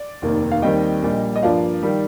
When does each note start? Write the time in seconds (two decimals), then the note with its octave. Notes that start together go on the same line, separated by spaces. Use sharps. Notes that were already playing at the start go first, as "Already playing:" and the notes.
Already playing: D5
0.22 F1 D#2 D#3 A#3
0.52 F5
0.62 D#2 D#3 G3 C4 D#5 G5
1.03 A#1 A#2 G3
1.36 D#5
1.43 G2 F3 A#3 D5 F5
1.83 D#3 G3